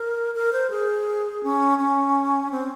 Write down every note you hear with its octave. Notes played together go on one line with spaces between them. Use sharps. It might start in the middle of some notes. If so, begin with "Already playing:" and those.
Already playing: A#4
A#4
C5
G#4
C#4
C#4
C4